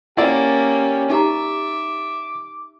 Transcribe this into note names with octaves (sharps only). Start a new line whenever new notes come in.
A#3 C#4 E4 G4 D5 F#5
D#4 G4 E5 A#5 D6